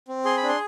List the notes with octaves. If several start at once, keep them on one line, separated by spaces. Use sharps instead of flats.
C4
G#4 C6
B5
D4
C6